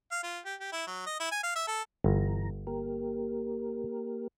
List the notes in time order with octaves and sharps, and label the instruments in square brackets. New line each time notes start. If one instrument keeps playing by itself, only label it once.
[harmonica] F5
F4
G4
G4
E4
F#3
D#5
E4
G#5
F5
E5
A4
[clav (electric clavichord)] G1 [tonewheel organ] G2 E3 A#5
[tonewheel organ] A#3 G4 A#4